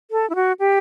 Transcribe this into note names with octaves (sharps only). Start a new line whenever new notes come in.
A4
E4
F#4
G4